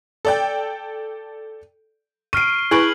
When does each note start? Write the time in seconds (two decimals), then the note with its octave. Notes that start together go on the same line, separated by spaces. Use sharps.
0.25 A4 D5 G5
2.33 C#6 F6 C7 D7 D#7
2.71 E4 G#4 B4 C#6 G#6 D7 F#7